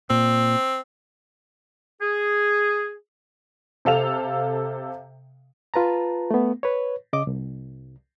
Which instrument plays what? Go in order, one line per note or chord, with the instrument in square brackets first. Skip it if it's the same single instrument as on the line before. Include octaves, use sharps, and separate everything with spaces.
[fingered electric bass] A#2 [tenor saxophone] C4
[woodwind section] G#4
[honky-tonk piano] C3 A4 F5 F7
[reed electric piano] F4 B4 A5 A#5
A3 B3
B4 C#5
C#3 D#5 D6
C2